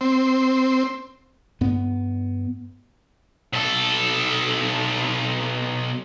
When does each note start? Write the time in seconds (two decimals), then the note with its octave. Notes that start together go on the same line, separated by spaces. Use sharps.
0.01 C4
1.61 G2 B3
3.53 B1 A4